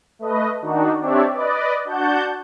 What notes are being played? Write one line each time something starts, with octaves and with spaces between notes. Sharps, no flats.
A3 B4 D#5
D#3 D4 D#4 F#4
C4 D4 G4 C#5 D5 E5
B4 D5 D#5
D4 F#4 F#5 A5 G6